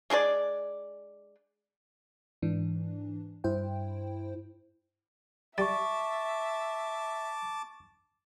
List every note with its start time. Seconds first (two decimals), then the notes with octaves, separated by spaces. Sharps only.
0.10 G#3 D4 G#4 D5
2.42 G#2 E3 D4
3.44 G2 E4 C5 G5
5.58 G3 E5 A5 C#6 D6 A6